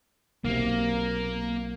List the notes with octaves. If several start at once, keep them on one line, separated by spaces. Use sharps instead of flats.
B1 C3 A#3